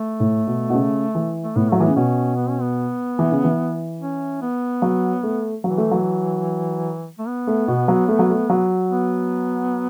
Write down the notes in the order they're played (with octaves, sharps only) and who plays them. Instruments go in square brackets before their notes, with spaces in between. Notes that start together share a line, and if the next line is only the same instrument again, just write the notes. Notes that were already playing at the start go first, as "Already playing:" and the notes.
Already playing: [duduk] A3
[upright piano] A2
B2
B2
C#3
E3
[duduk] A3
[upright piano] A2 [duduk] B3
[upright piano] F#3 [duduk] A3
[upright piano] E3
[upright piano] C#3 [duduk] B3
[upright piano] B2 [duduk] C#4
[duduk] B3
C#4
B3
[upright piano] E3
C#3
E3
[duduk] C#4
B3
[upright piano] F#3
A3
[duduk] E3 [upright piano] F#3
[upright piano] A3
F#3
[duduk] A3
B3
[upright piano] A3
B2
F#3
A3
F#3
A3
F#3
[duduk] B3